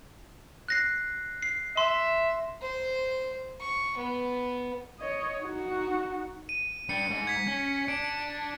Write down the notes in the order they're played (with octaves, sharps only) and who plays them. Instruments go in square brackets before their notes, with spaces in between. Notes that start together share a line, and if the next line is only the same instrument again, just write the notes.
[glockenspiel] F#6 A#6 C7
C7
[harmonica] E5 [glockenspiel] C6
[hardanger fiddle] C5
C#6
B3
[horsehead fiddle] C#5 D#5
D#4 F#4
[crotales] D#7
[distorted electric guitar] G3 D4 [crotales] C#7
[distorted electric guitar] G#2
[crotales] G#6 B6
[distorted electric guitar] C#4
[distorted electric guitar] D4 [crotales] D7